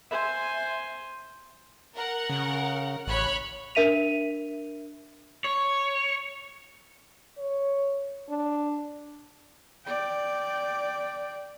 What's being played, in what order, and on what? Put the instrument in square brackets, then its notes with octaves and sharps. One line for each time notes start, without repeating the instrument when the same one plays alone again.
[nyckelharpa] C5 G#5 [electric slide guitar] E5
[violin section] A#4 F#5
[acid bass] C#3
[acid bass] A1 [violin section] C#5 B5 F#6
[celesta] D4 A#4 E5 B6 D#7 F7
[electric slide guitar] C#5
[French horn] C#5
D4
[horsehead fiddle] D5 G5